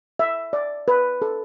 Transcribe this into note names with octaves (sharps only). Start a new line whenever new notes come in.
E5
D5
B4
A4